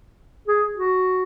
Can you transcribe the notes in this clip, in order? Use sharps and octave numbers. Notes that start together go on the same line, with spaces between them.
G#4
F#4